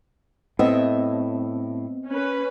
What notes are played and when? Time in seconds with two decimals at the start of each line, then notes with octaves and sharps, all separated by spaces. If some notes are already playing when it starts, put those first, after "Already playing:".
0.59 A2 B3 C4 D#5 E5
2.09 C#4 B4